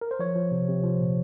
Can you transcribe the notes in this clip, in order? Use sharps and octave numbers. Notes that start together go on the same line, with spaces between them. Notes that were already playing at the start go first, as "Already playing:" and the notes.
A#4
C5
F3 C#5
F3
C3
C3
F3
A#2